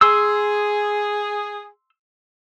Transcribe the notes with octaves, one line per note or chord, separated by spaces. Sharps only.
G#4 C6 E6